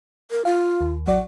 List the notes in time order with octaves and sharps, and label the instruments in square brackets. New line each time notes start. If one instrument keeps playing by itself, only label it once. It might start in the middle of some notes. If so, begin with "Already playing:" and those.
[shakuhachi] A#4
[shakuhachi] F4 [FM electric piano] F5
[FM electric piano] D#2
[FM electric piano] A1 F#3 D5 [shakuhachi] F#5